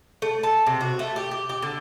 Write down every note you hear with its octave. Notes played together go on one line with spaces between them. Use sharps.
A3
A5
C3
F#4
A3
G4
G4
G4
D3